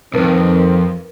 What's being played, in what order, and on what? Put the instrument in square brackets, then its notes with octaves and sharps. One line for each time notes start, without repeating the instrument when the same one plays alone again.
[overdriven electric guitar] B1 F2 [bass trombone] D#3 [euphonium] C4 [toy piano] D#4 A#4 B4